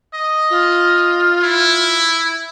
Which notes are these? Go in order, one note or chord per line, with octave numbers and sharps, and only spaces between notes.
D#5
F4
E4